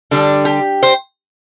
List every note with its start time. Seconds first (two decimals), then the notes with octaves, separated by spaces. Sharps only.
0.11 D3 G3 D4
0.45 G4
0.83 C5